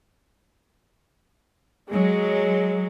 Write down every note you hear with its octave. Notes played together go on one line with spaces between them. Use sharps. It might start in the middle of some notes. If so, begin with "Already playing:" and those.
F#3 G#3